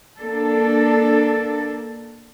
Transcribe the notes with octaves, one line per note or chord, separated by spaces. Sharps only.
A#3 D4 A4